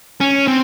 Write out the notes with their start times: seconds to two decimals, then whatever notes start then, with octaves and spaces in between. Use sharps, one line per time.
0.20 C#4
0.47 C4